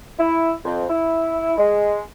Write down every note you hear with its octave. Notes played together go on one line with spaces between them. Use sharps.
E4
F2
E4
G#3